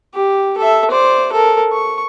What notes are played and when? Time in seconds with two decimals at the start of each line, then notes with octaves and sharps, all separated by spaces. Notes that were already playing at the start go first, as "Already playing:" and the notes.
0.14 G4
0.57 A4 E5
0.91 C5 D5
1.32 A4 A#4
1.72 C#6